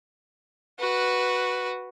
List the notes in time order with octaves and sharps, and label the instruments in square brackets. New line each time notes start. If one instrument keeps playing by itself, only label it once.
[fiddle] F#4 B4